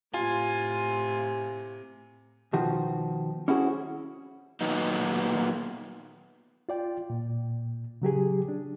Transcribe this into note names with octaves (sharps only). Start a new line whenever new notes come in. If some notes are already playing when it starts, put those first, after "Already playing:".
A2 C3 F4 G#5
B2 D#3 F3 F#4
C#4 E4 F#4 G#4 A4 C5
A#2 D#3 F#3 B3 D#4
F4 D5 G5
A#2
C#3 F#3 G4 G#4
D4